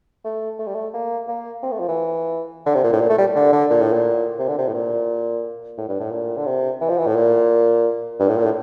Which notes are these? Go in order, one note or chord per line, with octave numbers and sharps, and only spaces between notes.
A3
A3
G3
A3
A#3
A#3
C4
A3
F3
E3
D3
C3
A#2
A2
A#2
A3
G3
D3
D3
A#2
A2
A#2
C3
D3
C3
A2
A#2
A2
G2
A2
A#2
D3
C3
E3
F3
E3
A2
A#2
G2
A2
A#2
A2